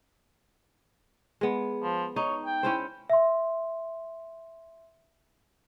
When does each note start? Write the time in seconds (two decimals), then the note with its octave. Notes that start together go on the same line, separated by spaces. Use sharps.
1.41 G#3 B3
1.83 F3
2.16 D#4 C#5
2.46 G5
2.63 C#4 E4 C5
3.10 E5 C6